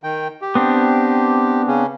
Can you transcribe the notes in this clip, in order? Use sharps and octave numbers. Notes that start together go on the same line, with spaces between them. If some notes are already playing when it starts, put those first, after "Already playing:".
D#3 G5
G4
B3 C4 D4
C#3 C#4